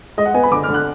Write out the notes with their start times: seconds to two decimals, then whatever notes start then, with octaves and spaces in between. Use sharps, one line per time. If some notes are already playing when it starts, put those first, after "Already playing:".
0.18 G#3 D#5
0.26 F#5
0.34 B3 G#5
0.43 B5
0.52 D3 D6
0.63 F6
0.68 D3
0.74 F#6